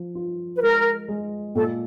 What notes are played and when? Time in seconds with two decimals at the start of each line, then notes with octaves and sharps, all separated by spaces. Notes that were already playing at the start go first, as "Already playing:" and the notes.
Already playing: F3
0.15 F4
0.55 B4
0.62 G#3 A#4
1.08 G#3
1.55 A#2 A4